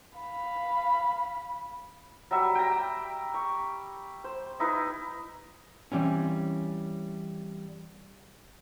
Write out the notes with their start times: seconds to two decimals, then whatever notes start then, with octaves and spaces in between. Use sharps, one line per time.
0.18 F5 B5
2.31 F#3 G3 E5
2.55 G5 A#5
3.34 C#6
4.24 C5
4.60 D#4 E4 B4
5.92 E3 G3 C4 C#4